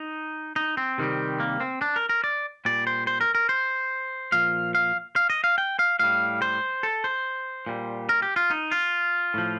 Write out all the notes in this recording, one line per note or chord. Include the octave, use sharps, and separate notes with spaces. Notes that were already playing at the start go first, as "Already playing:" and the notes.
Already playing: D#4
D#4
C4
C3 D#3 G3
A#3
C4
D4
A#4
A#4
D5
A#2 G3 D5
C5
C5
A#4
A#4
C5
A#2 F3 F5
F5
F5
D#5
F5
G5
F5
A2 G3 F5
C5
A4
C5
A#2 G3
A#4
G4
F4
D#4
F4
A2 F3